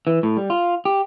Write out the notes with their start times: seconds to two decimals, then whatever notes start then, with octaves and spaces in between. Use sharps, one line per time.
0.07 E3
0.23 A2
0.37 G3
0.50 F4
0.85 G4